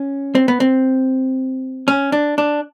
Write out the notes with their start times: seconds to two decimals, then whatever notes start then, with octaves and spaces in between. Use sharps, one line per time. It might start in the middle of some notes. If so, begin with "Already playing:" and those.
Already playing: C#4
0.35 C4
0.48 B3
0.60 C4
1.88 C#4
2.12 D4
2.38 D4